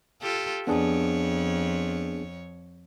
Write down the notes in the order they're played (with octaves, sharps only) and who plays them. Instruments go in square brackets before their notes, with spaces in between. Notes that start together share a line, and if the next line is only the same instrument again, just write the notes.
[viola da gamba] F4 G4 A4
[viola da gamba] F2 C#5 [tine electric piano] B3 D4 G#4